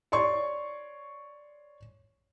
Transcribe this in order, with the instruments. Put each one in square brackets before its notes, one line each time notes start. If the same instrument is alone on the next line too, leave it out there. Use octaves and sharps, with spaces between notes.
[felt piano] C#5 D5 C6 C#6